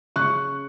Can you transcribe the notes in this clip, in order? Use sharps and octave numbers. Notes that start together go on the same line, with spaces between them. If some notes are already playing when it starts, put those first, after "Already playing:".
C#3 C#6 F#6